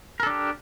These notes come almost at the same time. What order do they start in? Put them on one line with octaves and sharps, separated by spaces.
A#4 A4 D4 G4